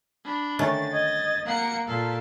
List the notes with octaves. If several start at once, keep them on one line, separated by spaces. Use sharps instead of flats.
D4 B5
D3 D#3 A3 C#4 A6
D#5 G#6
A#3 F5 F#5 C#7
A#2 A4 F5 A5